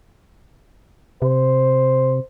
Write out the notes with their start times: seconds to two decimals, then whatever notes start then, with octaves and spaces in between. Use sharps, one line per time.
1.22 C3 C5